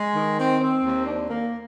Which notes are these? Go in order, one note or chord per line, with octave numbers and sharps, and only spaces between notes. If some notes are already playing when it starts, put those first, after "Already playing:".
Already playing: G#3
D#3
C4
C4
D#2
D4
A#3